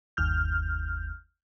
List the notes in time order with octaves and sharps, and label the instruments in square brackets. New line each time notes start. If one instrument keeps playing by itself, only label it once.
[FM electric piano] G1 D#2 F6 G6